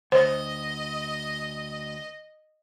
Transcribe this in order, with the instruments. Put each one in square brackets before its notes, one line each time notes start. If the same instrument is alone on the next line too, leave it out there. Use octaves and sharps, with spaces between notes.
[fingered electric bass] D2 [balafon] C5 [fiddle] D#5